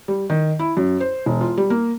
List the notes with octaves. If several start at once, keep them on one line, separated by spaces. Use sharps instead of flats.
G3
D#3
E4
F#2
C5
E1
F4
G3
A#3